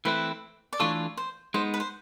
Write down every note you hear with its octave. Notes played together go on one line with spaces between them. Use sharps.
E3 A3 C4 E4 B4
D5
E3 A3 D4 F4 A4 C#5
C5
G#3 B3 D#4 C5
B4
C5